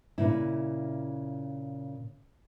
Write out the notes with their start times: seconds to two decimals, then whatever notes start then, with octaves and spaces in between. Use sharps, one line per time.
0.18 A#2 C#3 E4